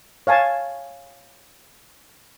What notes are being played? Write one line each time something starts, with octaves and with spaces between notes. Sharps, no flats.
C#5 F5 G#5 A5